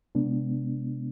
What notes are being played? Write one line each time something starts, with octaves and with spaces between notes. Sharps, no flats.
C3 G#3 B3 D4